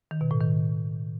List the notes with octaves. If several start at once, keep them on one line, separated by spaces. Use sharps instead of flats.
D#3
B2
A2
D#3